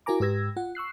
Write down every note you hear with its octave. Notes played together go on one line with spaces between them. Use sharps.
E4 F#4 A#4 G#5 A#5 D6
G#2 G4 B4 E6 G#6 A#6
F4 F#5
C#6 E6 F#6 C7